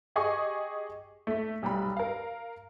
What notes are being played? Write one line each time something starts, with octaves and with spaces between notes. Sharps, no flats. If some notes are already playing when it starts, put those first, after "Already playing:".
G4 G#4 D#5 G#5 C#6 D6
A3 B6
B1 G3 A#5 B5
A#4 F5